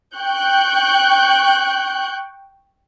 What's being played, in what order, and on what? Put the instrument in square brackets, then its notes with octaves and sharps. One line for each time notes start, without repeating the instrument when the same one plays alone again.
[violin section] G5 C#6 F#6 G6